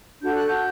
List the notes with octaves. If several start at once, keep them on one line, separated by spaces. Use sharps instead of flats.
D4 F#4 A4 G6
F#6
G6